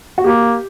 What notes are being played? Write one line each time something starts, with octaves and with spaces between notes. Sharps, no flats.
F#4
A#3 G4